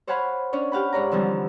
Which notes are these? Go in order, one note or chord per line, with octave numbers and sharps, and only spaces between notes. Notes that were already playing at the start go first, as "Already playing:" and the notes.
C5 C#5 F5 F#5 G#5 B5
C#4 D4 C#5
G4 F5 F#5 B5
G#2 C#5 D5 A#5
D3 E3 F3 G3 C4